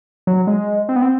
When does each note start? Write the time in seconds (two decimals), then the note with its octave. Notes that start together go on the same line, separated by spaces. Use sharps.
0.27 F#3
0.47 G#3
0.89 C4
0.96 B3
1.02 C4